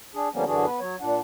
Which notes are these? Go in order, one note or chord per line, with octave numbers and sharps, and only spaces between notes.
D4 G#4
D3 F3 G3 A#3 B3 C#4
F#2 D3 E3 D4 F#4 G#4
B3 B4
F#3 C#5
A#2 D4 F#5